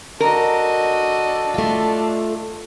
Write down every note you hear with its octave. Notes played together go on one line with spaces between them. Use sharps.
F#4 A4 A#4 D5 D#5 A5
A3 F4